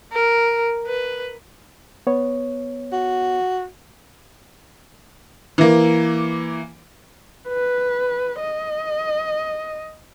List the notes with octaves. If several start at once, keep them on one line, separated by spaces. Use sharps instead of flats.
A#4
B4
B3 C#5
F#4
E3 A#3
B4
D#5